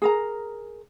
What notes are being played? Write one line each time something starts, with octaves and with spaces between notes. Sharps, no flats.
G#4 A#4 A#5